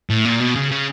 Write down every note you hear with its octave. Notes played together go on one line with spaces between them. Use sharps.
A2
A#2
B2
C#3
C#3